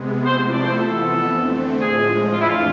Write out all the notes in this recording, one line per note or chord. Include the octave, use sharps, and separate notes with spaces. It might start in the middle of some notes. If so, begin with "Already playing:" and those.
Already playing: C3 G#3 B3
C3 F3 A3 E4 C5
C5
D5
C5
F2 E3 B3 A4
D3 A3 C4
A2 F3 G#3 G#4
F2 E3 A3 D4 F4
E4
F4